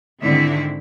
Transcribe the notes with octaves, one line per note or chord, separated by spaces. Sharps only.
G#2 D3 D#3 C4 E4 E5